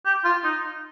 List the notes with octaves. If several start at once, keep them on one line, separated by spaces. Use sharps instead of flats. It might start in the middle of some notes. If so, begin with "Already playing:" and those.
G4
F4
D#4